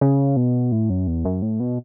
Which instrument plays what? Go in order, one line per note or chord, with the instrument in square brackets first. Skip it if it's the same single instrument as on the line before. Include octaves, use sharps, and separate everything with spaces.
[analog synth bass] C#3
B2
A2
F#2
E2
F#2
A2
B2